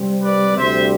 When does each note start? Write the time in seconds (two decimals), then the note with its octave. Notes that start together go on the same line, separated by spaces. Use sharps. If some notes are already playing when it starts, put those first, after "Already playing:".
Already playing: C3 G3 C4
0.23 B4 D5
0.56 D2 C3 G3 C5 E5